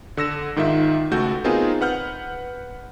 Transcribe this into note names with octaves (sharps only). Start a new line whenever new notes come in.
D3 E6 A#6 E7
G#2 D#3 D#4 F4 E5
C#2 A3 F#4 A4 G6
B3 C4 D#4 F4 G#4 A#4
B4 F#5 F6 G6